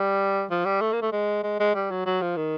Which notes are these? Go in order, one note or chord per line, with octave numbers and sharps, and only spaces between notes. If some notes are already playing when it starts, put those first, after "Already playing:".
Already playing: G3
F3
G3
A3
A#3
A3
G#3
G#3
G#3
G3
F#3
F#3
F3
D#3